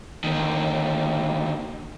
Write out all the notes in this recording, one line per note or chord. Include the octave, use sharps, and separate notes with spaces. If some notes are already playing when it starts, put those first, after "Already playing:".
D2 D#3